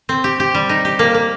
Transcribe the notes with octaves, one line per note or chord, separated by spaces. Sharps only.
C4
G4
G4
G3
D#4
G4
A#3
A#3